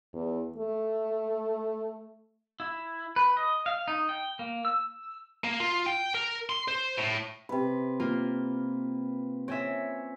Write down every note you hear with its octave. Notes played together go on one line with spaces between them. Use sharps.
E2
A3
E4
B4
D#5
F5
D#4
G5
A#3
E6
A#3
F4
G5
A#4
C6
C5
A2
C3 B4
A#3 F4
C4 C#4 C#5 E5